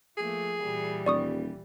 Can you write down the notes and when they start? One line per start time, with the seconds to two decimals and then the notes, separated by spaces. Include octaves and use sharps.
0.17 F3 A3 A#3 G#4
0.62 A#2 E3 G3
1.06 D#1 D5 C#6 D#6